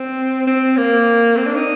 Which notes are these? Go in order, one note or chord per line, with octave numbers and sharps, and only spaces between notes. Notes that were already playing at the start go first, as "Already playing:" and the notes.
Already playing: C4
C4
A#3
C4
D4
D#4